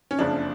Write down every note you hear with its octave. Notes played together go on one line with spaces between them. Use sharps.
C#4
F#1 F2 C#3 F3 D4